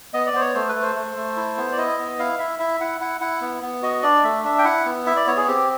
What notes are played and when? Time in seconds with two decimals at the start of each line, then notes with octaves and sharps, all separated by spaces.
0.14 B3 D#5
0.26 D5
0.33 B3 C5
0.41 C#5
0.54 A3 C5
0.69 B4
0.75 A3
0.82 C5
0.95 A3
1.16 A3
1.37 E4
1.57 B3
1.72 D5
1.78 E4 D#5
1.99 B3
2.19 E4 F5
2.39 E4 E5
2.59 E4 E5
2.80 E4 F#5
3.01 E4 F#5
3.21 E4 F#5
3.41 B3
3.62 B3
3.82 F#4 D#5
4.03 D4 D5
4.24 A3 E5
4.44 D4 E5
4.58 G5
4.65 E4 F#5
4.86 B3
5.06 E4 E5
5.16 D5
5.27 B3 C#5
5.37 G#4
5.47 C4 G4